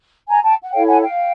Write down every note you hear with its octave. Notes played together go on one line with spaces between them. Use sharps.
G#5 A#5
G5 A5
F#5
E4 A4 C#5 F5 G5
F#5 G#5
F5 G5